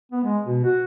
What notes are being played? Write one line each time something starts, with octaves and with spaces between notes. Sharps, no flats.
B3
G#3
B2
F#4